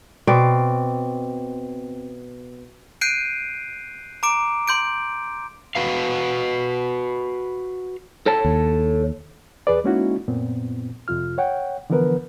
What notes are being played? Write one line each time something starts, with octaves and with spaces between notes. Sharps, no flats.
B2 C4 D5
F#6 G6 C7 D7 D#7
A#5 D6 D7
C6 G6 D7
F#4 B4 F5
A4 C#5 A5
D#2
E2 G#4 B4 D5
G#3 A#3 C#4 D#4 E4 F#4
F#2 A#2 B3 C4
F2 C3 F4 F6
C#5 F#5 G5
D3 E3 F3 B3 A#4 B4